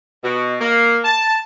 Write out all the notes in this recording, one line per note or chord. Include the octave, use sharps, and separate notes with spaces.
B2
A#3
A5